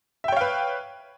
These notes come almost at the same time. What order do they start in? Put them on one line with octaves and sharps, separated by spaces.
E5 G5 C#5 F5 B4